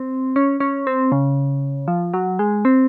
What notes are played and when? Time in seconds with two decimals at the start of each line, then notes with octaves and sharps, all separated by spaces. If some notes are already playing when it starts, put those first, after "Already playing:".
Already playing: C4
0.36 C#4
0.60 C#4
0.87 C4
1.12 C#3
1.88 F3
2.14 F#3
2.39 G#3
2.65 C4